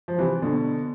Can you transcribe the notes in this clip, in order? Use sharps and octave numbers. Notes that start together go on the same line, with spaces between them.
F3
C3 E3
B2 D3